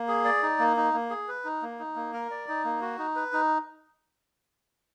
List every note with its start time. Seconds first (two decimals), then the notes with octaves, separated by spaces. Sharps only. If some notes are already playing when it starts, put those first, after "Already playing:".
Already playing: A#3
0.08 G#4
0.25 D5
0.42 D#4
0.59 A#3
0.77 D#4
0.94 A#3
1.10 G#4
1.28 B4
1.45 D#4
1.62 A#3
1.79 D#4
1.96 A#3
2.13 A#4
2.31 D5
2.48 D#4
2.65 A#3
2.81 F#4
2.99 D#4
3.16 B4
3.33 D#4